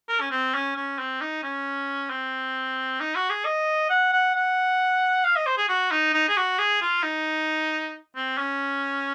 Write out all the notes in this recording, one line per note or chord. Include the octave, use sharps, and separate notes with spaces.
A#4
C#4
C4
C#4
C#4
C4
D#4
C#4
C4
D#4
F#4
G#4
D#5
F#5
F#5
F#5
F5
D#5
C5
G#4
F#4
D#4
D#4
G#4
F#4
G#4
F4
D#4
C4
C#4